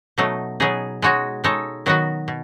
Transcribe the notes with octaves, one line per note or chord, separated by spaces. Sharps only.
B2 F#3 A3 D#4
B2 F#3 B3 D#4 G#4
G#3 D#4 F#4 C#5
G#3 D#4 A4 C#5
D#3 F#3 B3 D#4 F#4
B2